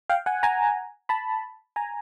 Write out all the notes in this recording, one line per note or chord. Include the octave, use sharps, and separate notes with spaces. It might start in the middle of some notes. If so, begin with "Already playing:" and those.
F5 G5
F#5 G#5
G#5 A#5
A5 B5
G#5 A#5